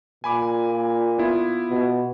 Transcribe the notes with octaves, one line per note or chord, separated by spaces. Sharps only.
A#2 G#5 B5 D6
B3 E4 F4
B2